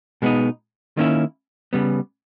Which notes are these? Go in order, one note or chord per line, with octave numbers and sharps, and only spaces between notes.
B2 G#3 B3 D#4
D#3 A#3 C#4 E4
C#3 G3 B3